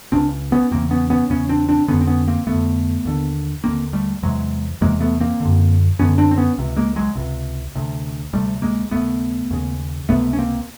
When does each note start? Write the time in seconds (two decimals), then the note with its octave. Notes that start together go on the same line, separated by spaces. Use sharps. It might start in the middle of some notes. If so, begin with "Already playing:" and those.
0.12 C#2 C#3 C4 D4
0.52 B3 C#4
0.71 E2 C#3 A#3 C4
0.91 B3 C#4
1.10 B3 C#4
1.29 E2 C#3 B3 C#4
1.49 C4 D4
1.69 C4 D4
1.88 F2 D3 B3 C#4
2.01 C4
2.07 B3 C#4
2.28 A#3 C4
2.47 D3 A3 B3
2.52 F2
3.05 D#2 D3
3.64 D#2 D3 A#3 C4
3.93 G3 A3
4.23 E2 C3 F#3 G#3
4.81 E2 C3 G#3 A#3
5.01 A3 B3
5.20 A#3 C4
5.40 D3
5.45 F#2
5.99 F#2 D3 B3 C#4
6.18 C4 D4
6.31 C4
6.38 B3 C#4
6.58 C#2 C3
6.76 G#3 A#3
6.96 F#3 G#3
7.15 C#2 C3
7.75 D2 C3
8.33 D2 C3 G3 A3
8.62 G#3 A#3
8.91 D#2 C#3 A3 B3
9.51 D#2 C#3
10.09 C#2 C3 A3 B3
10.33 C#4
10.38 A#3 C4